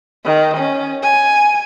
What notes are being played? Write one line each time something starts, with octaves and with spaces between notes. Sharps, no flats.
D#3
C#4
G#5